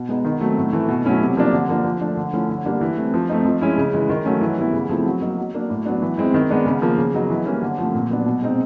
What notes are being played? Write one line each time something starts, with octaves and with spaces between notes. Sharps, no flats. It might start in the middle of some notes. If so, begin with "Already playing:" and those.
Already playing: B2
G#3 B3 D#4
D#3
F#3 A3 C4
A2
E3 A3
B2
F#3 A3 C#4 E4
C3
F3 A#3 D4
D3
F3 A#3 D4
F3
A3 D4
D3
F3 A3 C#4 E4
D3
G3 A#3 D4
E3
A3 C4
F3
A3 C4 D#4
F3
G#3 C#4 E4
C#3
E3 G#3
D#3
F#3 A3 C#4
E3
G3 B3 E4
C#3
F3 A3 C4 E4
F#3
A#3 D#4
F#3
A#3 D4
A2
F#3 B3 D4
E3
G#3 C4 E4
D#3
G#3 B3 D4
C#3
F3 A#3
C#3
F#3 B3 D#4
E3
G3 A#3 C#4
D3
F3 A3 C4
A#2
F#3 B3 D4
B2
G#3 C4 D#4